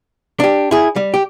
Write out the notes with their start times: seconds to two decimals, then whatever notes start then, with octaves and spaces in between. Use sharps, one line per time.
0.40 D4 G4
0.71 E4 G#4
0.96 G3
1.14 G4